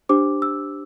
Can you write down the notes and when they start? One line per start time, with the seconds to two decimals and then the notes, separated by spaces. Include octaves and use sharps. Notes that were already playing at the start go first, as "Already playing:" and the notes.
0.09 D4 G4 C5 D6
0.42 E6